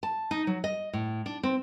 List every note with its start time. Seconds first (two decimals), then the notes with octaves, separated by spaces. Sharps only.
0.03 A5
0.31 D#4
0.47 F#3
0.64 D#5
0.93 A2
1.26 D4
1.43 C4